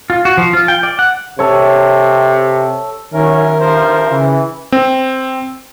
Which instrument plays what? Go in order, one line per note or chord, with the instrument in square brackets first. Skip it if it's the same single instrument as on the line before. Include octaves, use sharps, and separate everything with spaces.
[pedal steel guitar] F4
F#4
F3
F4
G5
D5
F#5
[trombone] C3 [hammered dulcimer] A4 C#5
[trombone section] F#2 C#4 [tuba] D#3 [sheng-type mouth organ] A#4 [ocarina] E5
[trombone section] A1 G2 F3 [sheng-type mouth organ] A#4 C5
[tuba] C#3 [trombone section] E3
[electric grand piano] C4